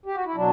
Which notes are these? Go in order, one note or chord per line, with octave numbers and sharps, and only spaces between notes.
G4
F#4
E4
B2 F#3 D4